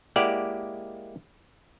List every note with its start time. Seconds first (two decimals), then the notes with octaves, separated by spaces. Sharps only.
0.16 G#3 A#3 E4 G4 D5 F#5